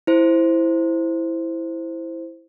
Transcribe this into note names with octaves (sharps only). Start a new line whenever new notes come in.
E4 C5